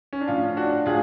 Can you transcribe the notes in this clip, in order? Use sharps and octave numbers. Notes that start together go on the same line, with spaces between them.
C#4
D4
A2 F3 C#4 F4
D4 F#4
A2 F3 F4 G#4